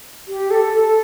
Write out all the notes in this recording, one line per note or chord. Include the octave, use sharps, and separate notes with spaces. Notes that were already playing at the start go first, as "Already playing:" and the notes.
G4
A4
A4